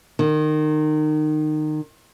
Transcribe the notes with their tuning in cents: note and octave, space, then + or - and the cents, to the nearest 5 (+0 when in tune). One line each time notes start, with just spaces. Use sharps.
D#3 -25